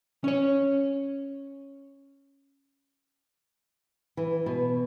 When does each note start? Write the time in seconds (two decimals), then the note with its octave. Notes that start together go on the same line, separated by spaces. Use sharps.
0.24 C#4 C#5
4.17 E3
4.46 B2